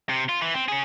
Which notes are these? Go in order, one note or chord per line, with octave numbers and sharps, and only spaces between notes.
C3
F4
E3
C4
C#4 G#4